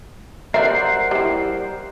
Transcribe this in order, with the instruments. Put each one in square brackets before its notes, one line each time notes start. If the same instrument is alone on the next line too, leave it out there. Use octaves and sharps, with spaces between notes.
[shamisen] G3 D5 E5 [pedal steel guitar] A#4 C5 F#5 [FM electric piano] C7
[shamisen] G3 E4